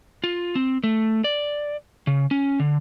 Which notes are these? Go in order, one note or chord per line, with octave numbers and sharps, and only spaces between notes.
F4
C4
A3
D5
C#3
C#4
D3